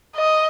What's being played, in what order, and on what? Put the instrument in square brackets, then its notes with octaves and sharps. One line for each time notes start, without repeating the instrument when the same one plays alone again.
[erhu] D#5